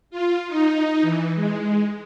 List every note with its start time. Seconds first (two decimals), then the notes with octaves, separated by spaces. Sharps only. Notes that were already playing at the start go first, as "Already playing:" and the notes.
0.11 F4
0.48 D#4
1.02 E3
1.35 G#3